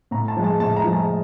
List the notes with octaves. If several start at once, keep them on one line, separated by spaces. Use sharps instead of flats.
A2 A#5
A5
F3 G#3
A5
A2 A5
A#5
F3 G#3
A5